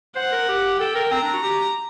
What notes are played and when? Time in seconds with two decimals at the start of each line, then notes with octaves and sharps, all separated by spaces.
0.16 C5 F#5
0.32 A#4
0.48 G4
0.79 A4 G5
0.95 A#4
1.11 C4 A#5
1.22 D4
1.33 F#4
1.43 G4